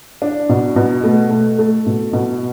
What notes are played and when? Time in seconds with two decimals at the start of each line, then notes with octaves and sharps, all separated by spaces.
0.22 D4
0.49 B2
0.76 B2
1.04 A3
1.31 A3
1.59 A3
1.86 B2
2.13 B2